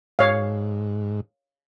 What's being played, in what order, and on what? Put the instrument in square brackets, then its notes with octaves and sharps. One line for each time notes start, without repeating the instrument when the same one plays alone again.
[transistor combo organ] G#2 [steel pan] C#5 F5